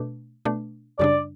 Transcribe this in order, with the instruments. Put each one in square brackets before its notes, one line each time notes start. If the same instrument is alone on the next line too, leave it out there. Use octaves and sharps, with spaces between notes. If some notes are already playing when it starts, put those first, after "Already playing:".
Already playing: [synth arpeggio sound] B2 A3 D4
B2 A3 D4
[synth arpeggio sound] F#2 C#3 G3 D4 [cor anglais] D5